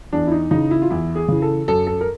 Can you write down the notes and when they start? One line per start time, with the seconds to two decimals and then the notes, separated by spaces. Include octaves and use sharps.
0.13 E2 D4
0.27 E4
0.32 D#4
0.51 C#3 E3 D#4
0.71 E4
0.82 F4
0.90 E2 E4
1.15 G#4
1.28 C#3 E3
1.42 A4
1.68 F#2 A4
1.87 A4
2.01 A#4